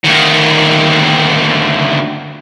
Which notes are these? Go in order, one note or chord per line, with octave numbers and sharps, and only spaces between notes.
D2 D#3